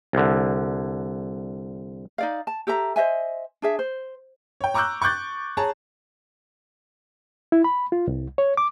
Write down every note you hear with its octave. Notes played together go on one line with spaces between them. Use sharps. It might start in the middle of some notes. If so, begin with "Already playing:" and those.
C2 D3
D#4 D5 F5
A5
G4 A4 E5 A#5
C5 D#5 E5 G#5
D4 G#4 E5
C5
C#5 G5
A#5 C#6 D6 E6 F#6 G6
C#6 D6 F#6 G6 A6
G#4 C#5 A5 A#5
E4
B5
F4
C2
C#5
D6